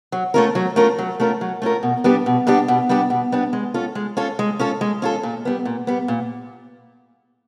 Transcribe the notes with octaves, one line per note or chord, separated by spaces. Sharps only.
F#3
A3 C#4 F4 A#4
F#3
A3 C#4 F4 A#4
F#3
A3 C#4 F4 A#4
F#3
A3 C#4 F4 A#4
B2
G3 B3 D4 G4
B2
G3 B3 D4 G4
B2
G3 B3 D4 G4
B2
G3 B3 D4 G4
G#3
C#4 F4 A4
G#3
C#4 F4 A4
G#3
C#4 F4 A4
G#3
C#4 F4 A4
A#2
G3 B3
A#2
G3 B3
A#2